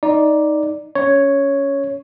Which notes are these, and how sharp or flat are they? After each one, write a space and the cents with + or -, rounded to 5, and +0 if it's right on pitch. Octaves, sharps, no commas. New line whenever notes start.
D#4 +5 D5 +0
C#4 +15 C#5 +0